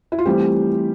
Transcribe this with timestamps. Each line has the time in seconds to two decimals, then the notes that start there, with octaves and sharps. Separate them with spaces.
0.12 E4
0.18 F4
0.25 E3 G3 A3 C4 G4